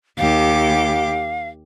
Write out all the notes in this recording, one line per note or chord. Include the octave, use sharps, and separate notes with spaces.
D#2 G4 F5 D6